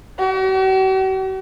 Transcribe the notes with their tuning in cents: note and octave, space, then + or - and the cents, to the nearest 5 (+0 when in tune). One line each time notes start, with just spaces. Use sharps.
F#4 +45